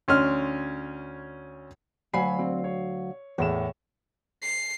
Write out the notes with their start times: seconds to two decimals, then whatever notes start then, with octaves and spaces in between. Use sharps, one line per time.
0.08 D2 C#4 C6 F6
2.13 D2 F#3 F5 G#5 B5 C7
2.39 C4
2.64 C#5
3.38 E2 A2 C#5 E7
4.42 C7